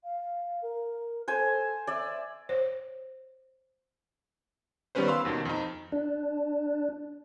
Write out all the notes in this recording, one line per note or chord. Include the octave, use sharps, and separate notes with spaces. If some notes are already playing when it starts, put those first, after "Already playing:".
F5
A#4
A4 C5 G#5
D5 E5 G#5
C5 C#5
D#3 G3 B3 C#4 B4 C5
F5 B5 C6 E6
D#2 B2 D#3
F2 D#4
D4